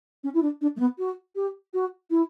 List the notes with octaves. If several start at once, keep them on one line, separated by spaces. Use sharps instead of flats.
C#4
E4
D4
D4
A3
B3
F#4
G4
F#4
E4